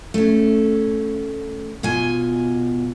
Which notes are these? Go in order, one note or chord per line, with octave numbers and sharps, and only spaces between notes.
A3 C#4
B2 F4 G#5